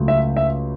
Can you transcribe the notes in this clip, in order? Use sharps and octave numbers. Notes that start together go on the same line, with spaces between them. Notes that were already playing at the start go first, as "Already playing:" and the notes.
Already playing: C#2 C#3 F#3 A3
E5
E5